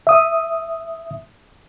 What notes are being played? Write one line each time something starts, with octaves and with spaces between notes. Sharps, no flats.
E5 D#6